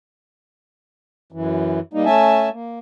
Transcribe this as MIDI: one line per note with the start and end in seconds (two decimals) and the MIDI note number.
1.32 1.80 42
1.32 1.80 52
1.94 2.05 55
1.94 2.05 58
1.94 2.05 63
2.06 2.49 57
2.06 2.49 61
2.06 2.49 76
2.06 2.49 80
2.06 2.49 81
2.52 2.79 58